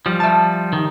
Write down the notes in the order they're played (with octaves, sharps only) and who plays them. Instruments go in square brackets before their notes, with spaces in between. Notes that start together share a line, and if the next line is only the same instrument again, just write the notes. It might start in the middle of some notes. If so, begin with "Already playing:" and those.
[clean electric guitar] F3 G3
[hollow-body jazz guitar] E5 A5
[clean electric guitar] D#3